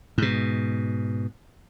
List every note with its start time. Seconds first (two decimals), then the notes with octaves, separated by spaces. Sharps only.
0.18 G#2 B2